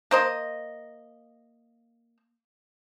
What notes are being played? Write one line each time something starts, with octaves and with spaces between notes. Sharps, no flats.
A#3 C5 D#5